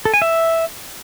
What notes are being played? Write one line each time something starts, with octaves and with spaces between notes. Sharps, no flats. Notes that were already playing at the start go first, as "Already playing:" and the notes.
A4
G#5
E5